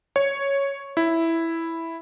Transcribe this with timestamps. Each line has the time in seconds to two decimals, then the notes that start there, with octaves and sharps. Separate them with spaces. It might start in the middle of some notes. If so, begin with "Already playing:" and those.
0.16 C#5
0.97 E4